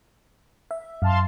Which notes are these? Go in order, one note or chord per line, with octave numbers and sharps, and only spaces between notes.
E5
F#2 F5 A5 C6